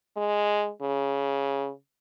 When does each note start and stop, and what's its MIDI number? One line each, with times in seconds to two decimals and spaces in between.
0.17 0.70 56
0.82 1.71 49